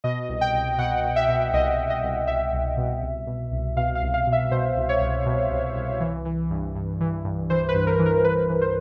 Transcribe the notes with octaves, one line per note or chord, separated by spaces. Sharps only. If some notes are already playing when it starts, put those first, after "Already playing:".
B2 D#5
C2
G5
C2
B2 F#5
B2
E5
B2
C2 D#5
C2
D#5
C2
C2 E5
C2
B2
C2
B2
C2
B2 F5
F5
C2
F5
B2
E5
B2 C5
C2
C#5
C2
B2
C2
C2
E3
E3
G2
G2
E3
G2
E3 C5
B4
G2
A#4
E3
A#4
E3 B4
E3
C5